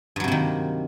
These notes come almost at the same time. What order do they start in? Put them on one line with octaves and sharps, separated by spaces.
G2 F#3 C3 A#3 D#3